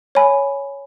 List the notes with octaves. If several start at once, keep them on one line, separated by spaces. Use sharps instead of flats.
C#5 G#5 B5